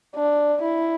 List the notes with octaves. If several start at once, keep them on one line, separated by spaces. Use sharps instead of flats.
D4
E4